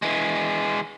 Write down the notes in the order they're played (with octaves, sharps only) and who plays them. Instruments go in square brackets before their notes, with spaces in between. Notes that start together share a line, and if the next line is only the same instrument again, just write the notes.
[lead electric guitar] E3 G#3